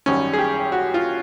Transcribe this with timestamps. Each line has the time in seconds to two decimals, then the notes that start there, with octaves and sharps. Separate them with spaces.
0.06 G#1 F#2 D#3 G3 C#4
0.33 G#4
0.39 G4
0.72 F#4
0.94 F4